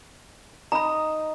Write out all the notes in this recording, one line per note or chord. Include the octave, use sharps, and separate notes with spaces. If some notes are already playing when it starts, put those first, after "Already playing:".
D#4 A#5 B5 D#6